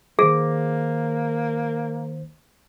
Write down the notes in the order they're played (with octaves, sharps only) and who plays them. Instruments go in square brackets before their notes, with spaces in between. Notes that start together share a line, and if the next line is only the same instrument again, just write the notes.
[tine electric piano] D#3 C5 A#6 [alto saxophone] A#3 [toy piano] G#4